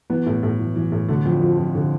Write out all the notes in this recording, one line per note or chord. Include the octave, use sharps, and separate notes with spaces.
E3 B3
A2
A2
E3
E3
A2
D3 A3
F2
F3
F2
D3